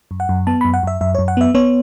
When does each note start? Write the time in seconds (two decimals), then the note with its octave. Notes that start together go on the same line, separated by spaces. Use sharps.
0.11 F#2
0.20 F#5
0.29 F#2
0.47 B3 A5
0.61 F#2 B5
0.74 F#5
0.83 F#2 E5
1.01 F#2 E5
1.15 F#2 C#5
1.28 F#5
1.37 B3 E5
1.55 B3 C#5